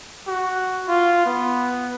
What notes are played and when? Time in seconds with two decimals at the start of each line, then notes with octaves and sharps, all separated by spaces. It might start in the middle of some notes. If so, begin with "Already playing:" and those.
0.28 F#4
0.89 F4
1.26 B3